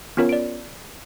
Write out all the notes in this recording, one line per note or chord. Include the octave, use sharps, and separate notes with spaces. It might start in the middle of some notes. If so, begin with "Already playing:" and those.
B3 C#4 F4 A#4 C#5
D5 D7